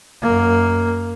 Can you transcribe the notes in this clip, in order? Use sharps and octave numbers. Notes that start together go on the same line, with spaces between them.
F#2 A#3